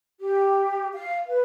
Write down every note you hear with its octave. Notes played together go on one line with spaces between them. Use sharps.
G4
F5
B4